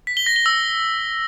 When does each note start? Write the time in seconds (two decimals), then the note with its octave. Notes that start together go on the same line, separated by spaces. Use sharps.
0.07 B6
0.17 G7
0.26 A#6
0.36 G7
0.46 E6